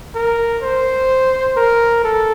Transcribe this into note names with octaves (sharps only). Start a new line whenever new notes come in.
A#4
C5
A#4
A4